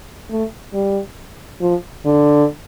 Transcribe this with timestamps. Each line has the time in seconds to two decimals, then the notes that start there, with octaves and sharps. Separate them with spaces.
0.30 A3
0.74 G3
1.62 F3
2.05 D3